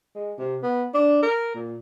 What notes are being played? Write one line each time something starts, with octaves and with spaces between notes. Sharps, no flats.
G#3
C3
B3
D4
A#4
A#2